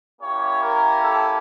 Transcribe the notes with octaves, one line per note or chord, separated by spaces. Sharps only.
A#3 C#4 E4 G4 C#5
A#4
A4